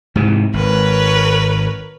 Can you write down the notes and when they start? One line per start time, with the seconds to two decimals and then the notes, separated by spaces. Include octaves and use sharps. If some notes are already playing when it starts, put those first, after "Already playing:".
0.15 G#2 C3 E3
0.53 G#1 A#4 B4 C#5